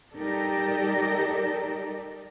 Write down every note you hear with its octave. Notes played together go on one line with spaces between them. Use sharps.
G3 D#4 G4 A4 A#4 D5